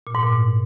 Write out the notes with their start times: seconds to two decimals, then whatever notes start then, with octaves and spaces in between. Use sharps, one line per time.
0.07 A#2
0.15 G#2
0.23 A#2